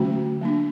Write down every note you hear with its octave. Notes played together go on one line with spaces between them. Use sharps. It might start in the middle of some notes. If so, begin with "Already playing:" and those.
Already playing: D3 F#3 A3 C#4 F#4
F#3 A#3 D4